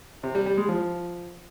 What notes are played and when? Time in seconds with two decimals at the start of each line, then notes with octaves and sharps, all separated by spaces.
0.23 C3
0.35 G3
0.46 G3
0.57 G#3
0.69 F3